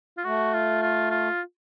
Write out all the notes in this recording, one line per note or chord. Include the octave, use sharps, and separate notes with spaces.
F4
A3 F#4
F4
F4
F4